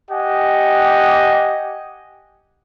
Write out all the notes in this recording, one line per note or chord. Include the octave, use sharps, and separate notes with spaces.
G4 D#5 F#5 G#5